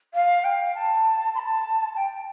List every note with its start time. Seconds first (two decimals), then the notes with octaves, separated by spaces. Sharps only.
0.14 F5
0.44 G5
0.75 A5
1.35 C6
1.39 A5
1.96 G5